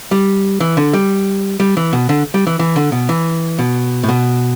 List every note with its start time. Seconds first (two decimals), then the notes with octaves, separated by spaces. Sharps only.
0.11 G3
0.60 E3
0.77 D3
0.93 G3
1.60 G3
1.77 E3
1.93 B2
2.09 D3
2.34 G3
2.47 E3
2.59 E3
2.76 D3
2.92 B2
3.09 E3
3.59 B2
4.03 A2
4.08 B2